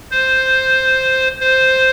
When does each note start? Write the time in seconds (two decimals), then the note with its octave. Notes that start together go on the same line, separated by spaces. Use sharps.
0.11 C5
1.40 C5